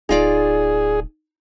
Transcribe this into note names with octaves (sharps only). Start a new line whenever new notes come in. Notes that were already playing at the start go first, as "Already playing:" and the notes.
D1 D#4 F4 G#4 D5